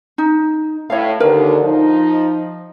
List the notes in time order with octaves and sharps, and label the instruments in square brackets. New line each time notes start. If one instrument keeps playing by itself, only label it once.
[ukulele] D#4
[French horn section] A2 [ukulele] C#5 E5 F5
[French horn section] D#2 D3 [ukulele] A#4 B4
[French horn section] F3 D#4